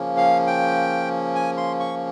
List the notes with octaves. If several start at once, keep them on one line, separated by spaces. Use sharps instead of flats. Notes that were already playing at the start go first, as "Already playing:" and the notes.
Already playing: C#3 F3 A#3 C#4
F5
G5
G#5
C6
C#6